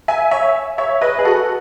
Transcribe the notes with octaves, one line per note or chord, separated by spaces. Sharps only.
E5 G#5
C#5 E5
C#5 E5
B4 D#5
G#4
F#4 A4